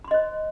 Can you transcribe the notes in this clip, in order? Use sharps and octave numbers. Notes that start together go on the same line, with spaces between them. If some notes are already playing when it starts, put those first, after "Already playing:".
C5 D#5 B5 C6